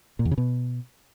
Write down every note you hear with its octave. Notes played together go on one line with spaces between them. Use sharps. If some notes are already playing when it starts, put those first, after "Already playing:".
A#2
E2
C#3
B2